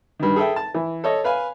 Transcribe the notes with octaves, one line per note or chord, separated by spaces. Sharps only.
G2 D#3
G#4 A4 E5 G5
A5
E3
A4 C#5 D#5
B4 F5 G#5